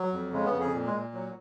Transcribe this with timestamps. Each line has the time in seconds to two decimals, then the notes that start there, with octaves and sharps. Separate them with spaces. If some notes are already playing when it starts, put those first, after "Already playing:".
Already playing: F#3
0.13 F2
0.33 C#3 G#3
0.46 B3
0.53 F2
0.60 G#4
0.74 A#2
0.86 G#3
0.94 A#2
1.14 F#3